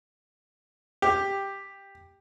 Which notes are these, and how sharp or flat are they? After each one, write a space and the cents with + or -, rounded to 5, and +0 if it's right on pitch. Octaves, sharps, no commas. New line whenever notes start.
G4 +5